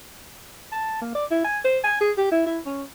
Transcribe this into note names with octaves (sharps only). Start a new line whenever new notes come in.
A5
A#3
D5
E4
G#5
C5
G#5
G#4
G4
E4
E4
C#4